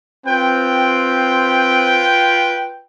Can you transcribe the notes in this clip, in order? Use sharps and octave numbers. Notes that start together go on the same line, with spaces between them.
C4 F4 B4 G5